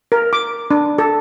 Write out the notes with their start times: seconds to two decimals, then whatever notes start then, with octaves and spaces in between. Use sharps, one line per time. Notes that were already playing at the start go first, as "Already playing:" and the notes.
0.12 A#4
0.33 D6
0.71 D4
0.98 A4